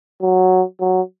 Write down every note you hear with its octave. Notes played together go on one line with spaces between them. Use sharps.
F#3
F#3